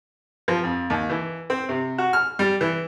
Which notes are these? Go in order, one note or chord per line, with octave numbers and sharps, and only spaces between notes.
F3
F2
D#2
E3
C4
C3
F#4
F6
G3
E3